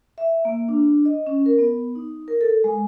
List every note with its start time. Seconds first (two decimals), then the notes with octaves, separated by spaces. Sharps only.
0.18 E5
0.45 A#3
0.68 D4
1.05 D#5
1.27 C#4
1.46 A#4
1.59 B3
1.95 D#4
2.28 A#4
2.41 A4
2.64 G#3